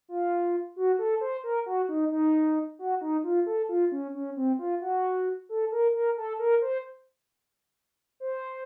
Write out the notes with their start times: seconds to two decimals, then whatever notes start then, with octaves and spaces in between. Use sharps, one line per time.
0.09 F4
0.76 F#4
0.99 A4
1.21 C5
1.44 A#4
1.66 F#4
1.89 D#4
2.12 D#4
2.79 F#4
3.01 D#4
3.24 F4
3.46 A4
3.69 F4
3.92 C#4
4.14 C#4
4.37 C4
4.59 F4
4.81 F#4
5.49 A4
5.72 A#4
5.95 A#4
6.17 A4
6.39 A#4
6.62 C5
8.20 C5